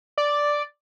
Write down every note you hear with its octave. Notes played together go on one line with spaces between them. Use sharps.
D5